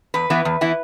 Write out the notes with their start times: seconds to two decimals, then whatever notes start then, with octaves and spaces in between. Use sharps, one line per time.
0.14 E2 B4
0.30 E3 B3 E4
0.45 E2
0.61 E3 B3 E4